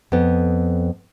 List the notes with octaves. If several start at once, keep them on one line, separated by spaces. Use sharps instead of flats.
F2 B3